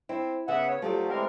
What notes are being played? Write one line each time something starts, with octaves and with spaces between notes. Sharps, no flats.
C4 E4
C#3 B3 E5 F#5
C#5
F3 F#3 A3 G4 D5
E3 G#3 C4 A#4